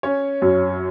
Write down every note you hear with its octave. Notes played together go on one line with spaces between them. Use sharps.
C#4 C#5
F#2